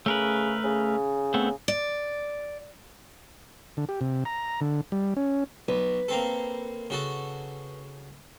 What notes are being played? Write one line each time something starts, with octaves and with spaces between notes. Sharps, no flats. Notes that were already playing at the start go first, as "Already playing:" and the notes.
C#3 A3 A#4 B4
C#3
A3 B3 C4
D5
D3
G4
C3
A#5
D3
G3
C#4
B1 B4
A#3 C4 A4
C#3 F#4 A4